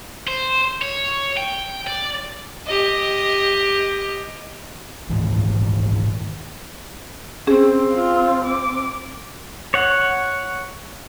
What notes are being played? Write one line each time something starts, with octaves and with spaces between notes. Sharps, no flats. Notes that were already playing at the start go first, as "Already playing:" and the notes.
C5
C#5
G5
D5
G4 D#5
D#1 D#2 G#2 E3
C4 C#4 G#4
F4
D6
C#5 F#5